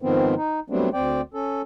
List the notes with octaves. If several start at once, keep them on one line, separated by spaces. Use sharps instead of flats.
G#2 D#3 F3 B3 C4
D#4
F#3 G3 A3 B3 C4 D4
D2 C4 D5 G5
C#4 A4